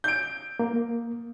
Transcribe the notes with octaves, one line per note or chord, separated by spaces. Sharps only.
G6 D7
A#3